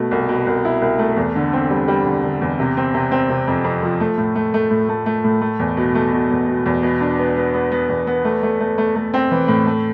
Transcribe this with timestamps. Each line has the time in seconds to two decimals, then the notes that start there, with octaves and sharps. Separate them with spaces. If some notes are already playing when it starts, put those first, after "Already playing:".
Already playing: B2 A3
0.11 C2
0.29 B2
0.47 C2
0.65 E4
0.82 C2
0.99 A3
1.17 E2
1.35 D3
1.53 C4
1.70 G3
1.88 G3
2.05 D3
2.23 D3
2.41 E2
2.59 C3
2.77 C4
2.94 C3
3.12 C4
3.29 C3
3.48 F2
3.64 F2
3.82 F3
4.00 A3
4.18 A2
4.35 A3
4.54 A3
4.70 A2
4.89 A3
5.06 A3
5.24 A2
5.41 A3
5.59 E2
5.77 B2
5.95 A3
6.12 B2
6.31 E2
6.48 B2
6.66 E2
6.83 B2
7.01 D4
7.19 B3
7.36 B3
7.54 B3
7.72 B3
7.89 E2
8.07 B3
8.24 A3
8.43 A3
8.60 A3
8.78 A3
8.95 A3
9.14 C4
9.31 E3
9.48 A2
9.66 A3